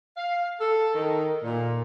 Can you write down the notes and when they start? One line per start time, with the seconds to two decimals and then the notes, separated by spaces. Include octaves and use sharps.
0.17 F5
0.60 A4
0.94 D#3
1.43 A#2